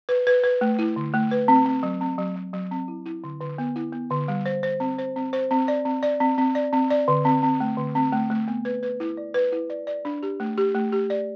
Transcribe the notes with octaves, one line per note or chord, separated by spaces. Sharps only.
B4
B4
B4
A3
E4
D3
A3
B4
C4
C4
F#3
C4
F#3
F#3
F#3
C4
E4
E4
D3
D3
B3
E4
B3
D3
G3
C5
C5
C4
C5
C4
C5
C4
D5
C4
D5
C4
C4
D5
C4
D5
D3
C4
C4
A3
D3
C4
A3
A3
B3
B4
B4
E4
D5
B4
E4
D5
D5
D4
G4
A3
G4
A3
G4
D5